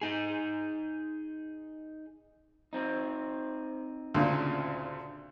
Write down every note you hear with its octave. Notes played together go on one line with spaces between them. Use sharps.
D#4 G#4
C4 D#4
D2 A#2 C#3